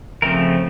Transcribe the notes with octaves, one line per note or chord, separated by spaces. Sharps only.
C#3 F3 A3 C4 A#4